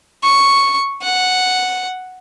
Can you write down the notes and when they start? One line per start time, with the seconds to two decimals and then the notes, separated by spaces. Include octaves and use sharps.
0.23 C#6
1.02 F#5